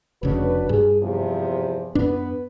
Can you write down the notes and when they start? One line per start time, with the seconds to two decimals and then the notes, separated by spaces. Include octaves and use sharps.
0.23 F1 C#3 D4 F#4 B4
0.69 G2 G#4
1.01 E2 C3 F3
1.95 F#2 B3 D4 B4